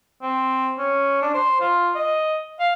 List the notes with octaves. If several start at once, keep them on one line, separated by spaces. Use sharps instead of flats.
C4
C#4
D4
C5
F4
D#5
F5